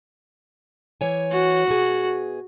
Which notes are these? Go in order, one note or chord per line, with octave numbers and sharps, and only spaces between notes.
E3 C#5 G#5
F#4
B2 G#4